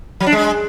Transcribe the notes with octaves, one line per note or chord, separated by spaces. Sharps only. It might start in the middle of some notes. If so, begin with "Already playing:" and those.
F#3
D4
G#3